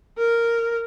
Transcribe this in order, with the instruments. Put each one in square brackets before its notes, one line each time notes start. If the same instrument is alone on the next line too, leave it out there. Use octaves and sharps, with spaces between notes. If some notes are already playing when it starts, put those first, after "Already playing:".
[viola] A#4